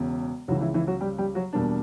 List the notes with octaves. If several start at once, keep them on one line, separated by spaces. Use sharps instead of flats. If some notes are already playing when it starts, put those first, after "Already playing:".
Already playing: E1 E2 C#3
C#2 C#3 E3 F#3 F#4
E3 E4
E3 E4
F#3 F#4
G3 G4
G3 G4
F#3 F#4
E2 B2 G3 A#3 D4